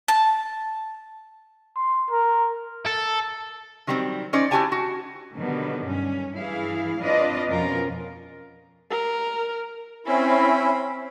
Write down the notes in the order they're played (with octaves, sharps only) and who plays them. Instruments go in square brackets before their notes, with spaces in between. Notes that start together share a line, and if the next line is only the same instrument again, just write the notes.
[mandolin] A5
[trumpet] C6
A#4
[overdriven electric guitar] A4
[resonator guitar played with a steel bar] D#3 F#3 G3 A#3 C4
C#4 D#4 C5 D5
E4 F#4 G4 D5 G#5 A5
F#4
[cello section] B2 D3 D#3 F#3 G3 B3
G2 C#4
G2 E3 E4 G#4 F5
C4 D4 F4 B4 D5 D#5
F2 B2 F3 C#4 F4 A#4
[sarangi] A#4
[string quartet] C4 B5 [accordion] C#4 E4